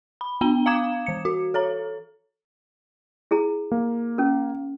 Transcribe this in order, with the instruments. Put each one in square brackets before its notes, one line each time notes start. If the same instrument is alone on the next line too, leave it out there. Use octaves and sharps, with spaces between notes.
[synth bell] B5
B3 D4 G5 G7
F5 A#5 D6 D#6 G#6 E7
E3 C#7
F#4
A4 C#5 A#5
[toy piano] E4 G#4 A#5
[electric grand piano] A#3
[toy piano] C#4 A#4